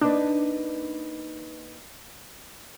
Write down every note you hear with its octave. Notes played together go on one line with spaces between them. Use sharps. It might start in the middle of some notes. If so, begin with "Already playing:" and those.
A#3 D4 D#4 B4